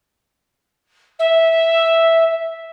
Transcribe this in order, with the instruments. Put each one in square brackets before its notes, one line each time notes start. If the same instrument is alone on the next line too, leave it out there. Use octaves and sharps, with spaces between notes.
[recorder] E5